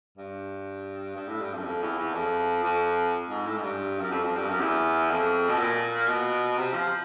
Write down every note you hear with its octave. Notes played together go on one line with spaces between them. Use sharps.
G2
G2
A2
G2
F2
F#2
F2
E2
E2
F2
F2
G#2
A2
G#2
G2
F#2
F2
F2
G2
F#2
E2
F2
B2
A#2
B2
C3
F3